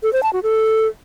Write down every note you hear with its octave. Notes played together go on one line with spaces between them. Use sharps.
A4
C5
A5
F#4
A4